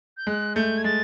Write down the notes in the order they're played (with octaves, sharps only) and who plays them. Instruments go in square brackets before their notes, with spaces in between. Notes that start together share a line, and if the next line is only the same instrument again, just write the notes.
[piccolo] G6
[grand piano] G#3 [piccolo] F#6
[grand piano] A3 [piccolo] G6
[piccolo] G#6
[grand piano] G#3 [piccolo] A6